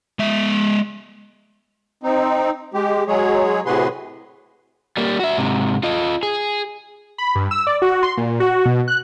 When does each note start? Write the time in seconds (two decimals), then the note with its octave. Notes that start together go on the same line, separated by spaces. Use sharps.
0.19 G#3 E5
2.04 C4 D#4
2.74 G#3 G4
3.08 F#3 G#3 G#4 C#5
3.66 A2 C3 F#4 G#4 B4 C6
4.97 G3 A#3
5.20 F#4 E5
5.37 G#2 C3
5.83 F4 D#5
6.23 G#4
7.18 B5
7.35 G2
7.51 E6
7.67 D5
7.82 F#4
8.03 C6
8.17 A#2
8.40 F#4
8.65 B2
8.88 F#6